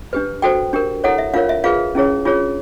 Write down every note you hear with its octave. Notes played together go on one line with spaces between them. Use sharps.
D4 G4 B4
F#4 A4 C5 G5
D4 G4 A#4
E4 A4 C#5 F#5
E5
D4 F4 A#4 C#5 F5
E5
F4 G#4 B4 F5
C#4 E4 G#4 C#5
D4 F4 G#4 C#5